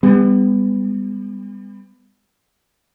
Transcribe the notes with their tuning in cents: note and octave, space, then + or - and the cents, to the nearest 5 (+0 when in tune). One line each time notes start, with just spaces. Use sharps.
G3 +40 B3 +25